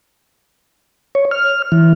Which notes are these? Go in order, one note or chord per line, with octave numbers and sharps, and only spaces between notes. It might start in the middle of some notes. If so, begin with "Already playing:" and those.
C#5
F6
E3